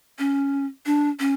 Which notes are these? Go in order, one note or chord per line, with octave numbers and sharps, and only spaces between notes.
C#4
D4
C#4